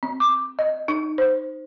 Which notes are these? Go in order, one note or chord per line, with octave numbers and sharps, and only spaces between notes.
C4
D6
D#5
D#4
C5